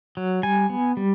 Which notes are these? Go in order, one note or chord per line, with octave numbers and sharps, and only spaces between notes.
F#3
G3 G#5
B3
G3